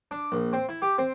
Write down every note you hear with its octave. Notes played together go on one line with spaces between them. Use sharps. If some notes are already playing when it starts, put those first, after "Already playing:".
D4
A#1
C4
E4
G4
C4